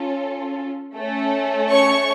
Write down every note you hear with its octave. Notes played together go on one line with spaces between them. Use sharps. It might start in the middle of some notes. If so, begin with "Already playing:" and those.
Already playing: C#4 F4 A4
A3 C#4 A4
C#5 C#6